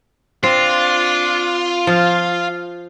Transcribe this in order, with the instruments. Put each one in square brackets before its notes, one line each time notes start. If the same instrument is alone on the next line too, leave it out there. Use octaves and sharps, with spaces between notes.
[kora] C4 [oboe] D4 [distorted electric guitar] F4
[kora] F3 [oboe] F5